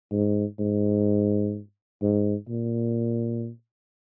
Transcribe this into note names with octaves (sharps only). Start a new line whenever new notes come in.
G#2
G#2
G#2
A#2